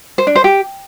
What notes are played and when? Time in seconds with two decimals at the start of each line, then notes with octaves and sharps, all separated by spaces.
0.18 C5
0.27 D4
0.35 C5
0.44 G4